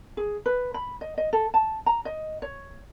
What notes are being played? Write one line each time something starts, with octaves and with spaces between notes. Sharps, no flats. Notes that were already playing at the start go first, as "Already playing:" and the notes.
G#4
B4
B5
D#5
D#5
A4
A5
A#5
D#5
C#5